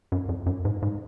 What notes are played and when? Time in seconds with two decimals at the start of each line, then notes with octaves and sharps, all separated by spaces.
0.12 F#2
0.29 F2
0.46 F#2
0.65 G#2
0.82 G#2